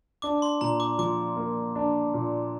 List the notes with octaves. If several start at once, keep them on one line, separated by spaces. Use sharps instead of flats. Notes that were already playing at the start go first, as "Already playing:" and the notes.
D4 D6
C6
A#2 A#5
D6
F3 D6
A#3
D4
A#2